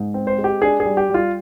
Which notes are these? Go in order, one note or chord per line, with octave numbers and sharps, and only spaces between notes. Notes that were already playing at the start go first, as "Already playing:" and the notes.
Already playing: G#2
C4
C5
G#3
G4
D4 G#4
G#4
G3
G4
G3 F4